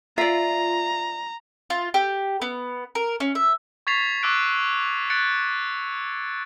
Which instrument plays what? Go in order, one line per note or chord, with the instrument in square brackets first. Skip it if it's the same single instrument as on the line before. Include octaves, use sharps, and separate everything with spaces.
[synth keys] F4 [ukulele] D5 E5 [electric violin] A#5
[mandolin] F4
G4
B3
A#4
C#4
E5
[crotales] C#6 G#6 A6 B6 C7 F7
C#6 D6 E6 F#6 D7
F#6 G#6 A6 C#7 D7